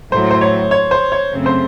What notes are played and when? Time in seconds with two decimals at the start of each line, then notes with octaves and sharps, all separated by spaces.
0.12 A2 F#3 A3 C5
0.31 C5
0.41 C#5
0.71 C#5
0.91 C5
1.12 C#5
1.31 F#2 C#3 F#3 A3 C4
1.46 C5